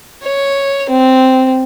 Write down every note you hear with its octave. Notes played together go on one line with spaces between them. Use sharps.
C#5
C4